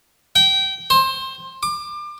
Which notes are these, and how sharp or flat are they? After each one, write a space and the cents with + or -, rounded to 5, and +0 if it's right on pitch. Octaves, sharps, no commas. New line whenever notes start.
G5 -25
C5 +20
D6 +30